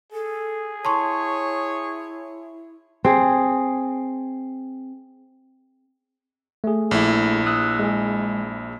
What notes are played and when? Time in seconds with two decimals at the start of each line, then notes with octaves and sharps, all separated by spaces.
0.12 G#4 A4
0.85 E4 C#5 A5 C6 C#6
3.04 C4 G#4
6.64 A3 G#4
6.91 A#1 E4
7.46 D#6 E6 F#6
7.79 G#3 G#4